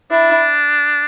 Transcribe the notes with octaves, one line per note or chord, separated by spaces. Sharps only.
D4 E4